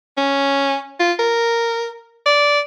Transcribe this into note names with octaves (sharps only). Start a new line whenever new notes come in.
C#4
F4
A#4
D5